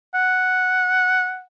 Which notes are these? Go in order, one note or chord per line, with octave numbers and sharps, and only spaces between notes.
F#5